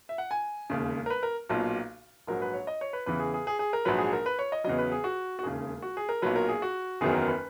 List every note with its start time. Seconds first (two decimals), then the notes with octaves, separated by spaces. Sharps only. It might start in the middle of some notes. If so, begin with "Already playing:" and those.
0.09 E5
0.18 F#5
0.31 G#5
0.70 E1 D#2 C#3
1.06 A#4
1.10 B4
1.23 A#4
1.49 B1 A#2 F#3
2.27 A#1 G#2 F#3 A#4
2.42 B4
2.54 C#5
2.67 D#5
2.81 C#5
2.93 B4
3.06 E2 C#3 E3 B4
3.19 G#4
3.34 G#4
3.47 G#4
3.59 G#4
3.73 A#4
3.85 A#1 G#2 F#3 B4
3.98 G#4
4.13 A#4
4.26 B4
4.39 C#5
4.52 D#5
4.64 E2 C#3 F#3 D#5
4.78 B4
4.92 G#4
5.04 F#4
5.39 F#4
5.43 E1 D#2 C#3 G#4
5.82 F#4
5.97 G#4
6.09 A#4
6.22 B1 A#2 F#3 B4
6.36 A#4
6.48 G#4
6.62 F#4
7.01 F#1 E2 D#3 F#3 G#4
7.14 A#4
7.28 B4